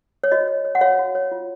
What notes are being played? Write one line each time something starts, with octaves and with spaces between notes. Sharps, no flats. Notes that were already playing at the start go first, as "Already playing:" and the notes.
C#5
F#4 D#5
C#5
C#5
F#5
F#4 C#5 F5
F#4
C#5
F4